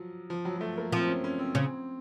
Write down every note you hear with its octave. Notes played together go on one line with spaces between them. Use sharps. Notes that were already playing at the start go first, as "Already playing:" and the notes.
Already playing: F3 F#3
F3
F#3
F#3
A3
A#3
F3 C4
C#4
C#4
C4
C#3 C4